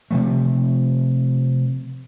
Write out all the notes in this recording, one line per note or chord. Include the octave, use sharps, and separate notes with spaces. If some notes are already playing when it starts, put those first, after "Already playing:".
C3 F3 A3